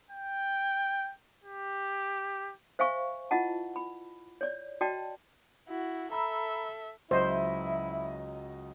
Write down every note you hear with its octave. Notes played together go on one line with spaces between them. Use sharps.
G5
G4
C5 E5 F5 G#5 C#6
E4 F4 D#5 F#5 A5
B5
C#5 D5
F#4 D5 D#5 G5 A5
E4 F#4
A4 E5 A#5 B5 E6
C#2 F#3 E4 C5 D#5 E5